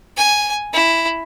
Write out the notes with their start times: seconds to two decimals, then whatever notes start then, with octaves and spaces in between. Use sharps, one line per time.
0.17 G#5
0.73 E4